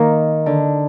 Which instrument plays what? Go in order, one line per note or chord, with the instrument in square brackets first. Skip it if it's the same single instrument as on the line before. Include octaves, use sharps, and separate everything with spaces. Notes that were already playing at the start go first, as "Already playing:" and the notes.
Already playing: [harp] D#3 [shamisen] A#3
[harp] D3